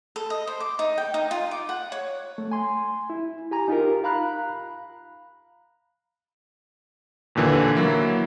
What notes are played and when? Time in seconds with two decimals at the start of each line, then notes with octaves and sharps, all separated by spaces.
0.16 A4
0.30 D#5
0.47 C5
0.60 D6
0.79 D#4
0.98 G5
1.14 D#4
1.31 F4
1.51 D6
1.69 F#5
1.92 C#5
2.38 A3
2.52 G#5 C6
3.10 E4
3.51 G4 G#5 A#5
3.68 D#4 F4 G4 A#4
4.04 F5 A#5 B5 F#6
7.35 D#2 A#2 D3 E3
7.75 F#3 A#3 E4